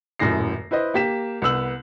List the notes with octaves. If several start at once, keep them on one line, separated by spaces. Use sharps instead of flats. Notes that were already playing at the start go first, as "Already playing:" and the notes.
D#1 F#2 A2 A#6 C7
E4 B4 C5 D#5
A#3 G4 B6 E7
C2 B3 E6 F#7